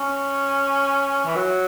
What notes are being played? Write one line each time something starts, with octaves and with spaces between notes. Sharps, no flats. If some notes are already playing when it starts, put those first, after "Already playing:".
Already playing: C#4
E3
F#3